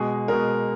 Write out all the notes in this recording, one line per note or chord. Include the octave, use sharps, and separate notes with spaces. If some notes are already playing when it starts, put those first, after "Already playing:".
Already playing: B2 G#3 G#4
B2 G#3 A#4